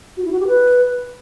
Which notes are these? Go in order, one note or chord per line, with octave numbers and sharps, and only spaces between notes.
F#4
E4
F#4
G4
B4